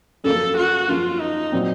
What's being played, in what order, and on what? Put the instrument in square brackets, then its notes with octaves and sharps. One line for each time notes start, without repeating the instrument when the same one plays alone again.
[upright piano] F#2 C#3 F3 A#3 [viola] A4
[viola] F#4
[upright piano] F#2 C#3 F3 A#3 [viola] F4
[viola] D#4
[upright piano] A#2 F#3 C4